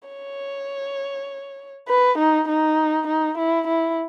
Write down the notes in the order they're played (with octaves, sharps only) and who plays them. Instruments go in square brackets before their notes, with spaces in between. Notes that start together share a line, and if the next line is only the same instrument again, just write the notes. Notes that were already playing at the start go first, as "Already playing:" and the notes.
[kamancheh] C#5
B4
D#4
D#4
D#4
E4
E4